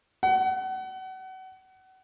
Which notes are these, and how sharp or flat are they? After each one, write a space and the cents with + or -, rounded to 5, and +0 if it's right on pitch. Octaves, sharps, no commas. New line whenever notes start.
F#5 +30